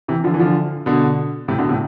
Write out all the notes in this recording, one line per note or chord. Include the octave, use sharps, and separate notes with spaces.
C3 E3
D3 F3
E3
D3 F3
B2 D3
A2 C3
B2 D3
A2 C3